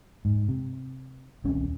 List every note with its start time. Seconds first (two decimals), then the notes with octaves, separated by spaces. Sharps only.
0.25 G#2
0.48 C3
1.44 D#1 C2 C3 C#4